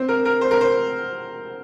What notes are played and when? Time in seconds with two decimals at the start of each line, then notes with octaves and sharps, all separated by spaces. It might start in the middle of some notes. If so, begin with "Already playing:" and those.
Already playing: C4
0.09 A#4
0.25 A#4
0.41 C5
0.51 A#4
0.61 C5